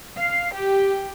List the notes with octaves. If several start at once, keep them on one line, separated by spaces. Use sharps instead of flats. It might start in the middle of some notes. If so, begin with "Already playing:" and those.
F5
G4